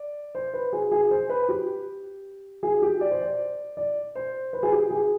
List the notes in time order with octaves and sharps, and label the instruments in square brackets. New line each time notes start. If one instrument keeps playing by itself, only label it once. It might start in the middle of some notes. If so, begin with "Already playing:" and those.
Already playing: [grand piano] D5
C5
B4
G#4
G#4
C5
B4
G4
G#4
G4
D5
C5
D5
D5
C5
B4
G#4
G4
G#4